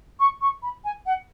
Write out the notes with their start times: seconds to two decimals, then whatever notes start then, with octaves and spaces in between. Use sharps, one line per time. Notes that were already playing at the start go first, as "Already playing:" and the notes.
0.19 C#6
0.41 C#6
0.62 B5
0.84 G#5
1.06 F#5